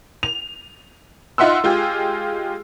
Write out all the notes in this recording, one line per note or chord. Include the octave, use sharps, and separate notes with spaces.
F7
D#4 F4 E5 F#5 C6 E6
G#3 F4 G4 G#4